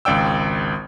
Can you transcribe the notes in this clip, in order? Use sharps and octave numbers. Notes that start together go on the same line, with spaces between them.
G#1 C#2 D5 G5 E6